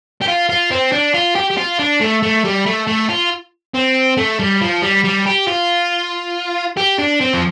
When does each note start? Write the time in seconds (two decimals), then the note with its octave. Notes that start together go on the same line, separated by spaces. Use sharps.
0.21 G4
0.28 F4
0.49 F4
0.71 C4
0.93 D4
1.14 F4
1.36 G4
1.51 G4
1.58 F4
1.79 D4
2.01 A3
2.23 A3
2.44 G3
2.66 A3
2.87 A3
3.10 F4
3.75 C4
4.18 A3
4.39 G3
4.61 F3
4.82 G3
5.04 G3
5.26 G4
5.47 F4
6.77 G4
6.99 D4
7.21 C4
7.34 F3